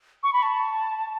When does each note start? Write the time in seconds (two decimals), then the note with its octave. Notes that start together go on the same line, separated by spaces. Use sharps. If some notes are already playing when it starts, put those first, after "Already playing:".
0.23 C#6
0.33 B5
0.42 A5